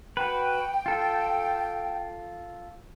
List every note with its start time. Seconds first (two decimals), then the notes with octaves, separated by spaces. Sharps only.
0.17 F#4 B4 G5
0.86 F4 A4